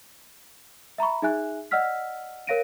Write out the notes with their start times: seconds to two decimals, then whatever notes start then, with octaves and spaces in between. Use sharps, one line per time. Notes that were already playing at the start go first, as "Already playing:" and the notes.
0.98 E5 A#5 B5 C#6
1.22 D#4 G#4 E5 G#5 F#6
1.71 D5 D#5 F#5 E6 F6 B6
2.47 A#4 C#5 F5 A#6 D7 D#7